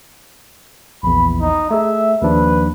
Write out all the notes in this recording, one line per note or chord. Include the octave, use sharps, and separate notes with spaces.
A#1 E2 B5
D#4
A3 G#4 E5
D#2 F3 D4 B4